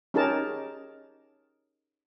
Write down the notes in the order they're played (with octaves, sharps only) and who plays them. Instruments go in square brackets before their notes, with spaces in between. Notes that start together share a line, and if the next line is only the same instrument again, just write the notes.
[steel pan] C#4 D#4 G4 G#4 A#4 A5